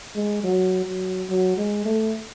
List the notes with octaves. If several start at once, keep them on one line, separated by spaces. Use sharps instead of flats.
G#3
F#3
F#3
F#3
G#3
A3